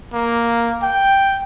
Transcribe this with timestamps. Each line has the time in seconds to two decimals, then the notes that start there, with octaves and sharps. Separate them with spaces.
0.14 A#3
0.82 G5